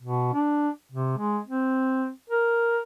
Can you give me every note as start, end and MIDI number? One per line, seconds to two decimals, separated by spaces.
0.03 0.33 47
0.34 0.69 62
0.92 1.15 48
1.18 1.40 56
1.47 2.09 60
2.30 2.80 70